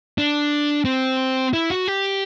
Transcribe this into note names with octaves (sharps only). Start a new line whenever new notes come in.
D4
C4
E4
F#4
G4